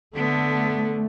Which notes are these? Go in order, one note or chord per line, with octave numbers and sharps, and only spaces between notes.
D3 A3 B3